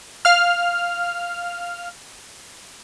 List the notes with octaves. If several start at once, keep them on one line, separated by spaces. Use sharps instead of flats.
F5 F6